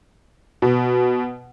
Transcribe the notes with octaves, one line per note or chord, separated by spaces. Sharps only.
B2